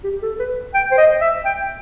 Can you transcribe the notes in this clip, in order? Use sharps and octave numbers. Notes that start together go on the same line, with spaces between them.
G4
A4
B4
G5
C5
D#5
E5
G5